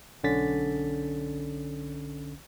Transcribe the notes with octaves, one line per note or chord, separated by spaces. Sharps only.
B1 D3 C#4 A6 B6